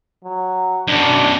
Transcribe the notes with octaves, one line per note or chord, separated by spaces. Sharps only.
F#3
F#2 B2 D4